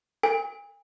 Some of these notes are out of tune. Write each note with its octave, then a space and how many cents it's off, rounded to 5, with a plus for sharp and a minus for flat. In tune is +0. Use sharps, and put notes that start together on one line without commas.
A4 +40 G#5 -40